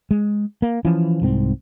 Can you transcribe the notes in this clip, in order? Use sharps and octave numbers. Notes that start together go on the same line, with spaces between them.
G#3
A#3
E3 F3 C#4
C2 G#2 C4